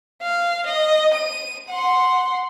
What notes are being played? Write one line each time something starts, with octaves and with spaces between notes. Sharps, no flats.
F5
D#5
D#7
F#5 C6